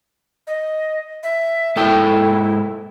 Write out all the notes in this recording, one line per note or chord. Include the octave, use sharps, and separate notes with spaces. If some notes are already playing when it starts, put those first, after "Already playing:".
D#5
E5
G#2 E4 A4 G5